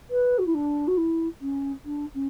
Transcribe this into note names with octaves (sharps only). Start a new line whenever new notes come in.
B4
F#4
E4
D4
F#4
E4
C#4
D4
C#4